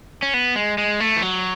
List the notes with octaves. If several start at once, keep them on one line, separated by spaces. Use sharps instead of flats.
C#4
B3
G#3
G#3
A3
E3
F#3